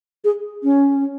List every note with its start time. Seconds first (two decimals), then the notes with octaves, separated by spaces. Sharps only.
0.24 G#4
0.63 C#4